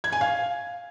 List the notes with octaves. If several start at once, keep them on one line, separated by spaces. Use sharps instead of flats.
G#6
G#5
F5